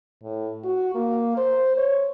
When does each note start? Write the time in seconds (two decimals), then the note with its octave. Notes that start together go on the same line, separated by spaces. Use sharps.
0.23 A2
0.64 F#4
0.95 A#3
1.37 C5
1.78 C#5